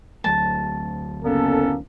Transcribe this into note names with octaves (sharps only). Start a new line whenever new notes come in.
D2 F#3 A3 A5
F#1 A#3 B3 C#4 A4